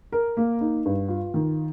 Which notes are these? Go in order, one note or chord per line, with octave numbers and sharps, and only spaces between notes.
A#4
A#3
D#4
G2
F4
D#3